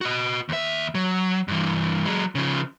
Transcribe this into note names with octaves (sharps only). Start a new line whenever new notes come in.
F#4 D#5
D#2 E5
F#3
G2 E3
F#3 G#3
C#3 F3